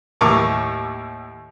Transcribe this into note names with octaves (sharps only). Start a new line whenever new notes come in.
D#2 A2 A#4 A5 C#6 D6